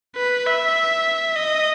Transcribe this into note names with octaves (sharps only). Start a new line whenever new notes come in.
B4
E5
D#5